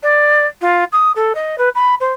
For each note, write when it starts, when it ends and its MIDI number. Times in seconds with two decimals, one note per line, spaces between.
0.03 0.45 74
0.61 0.84 65
0.92 1.12 87
1.15 1.33 69
1.35 1.56 75
1.58 1.69 71
1.75 1.95 83
2.00 2.13 72